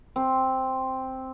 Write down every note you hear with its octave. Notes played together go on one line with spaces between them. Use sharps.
C4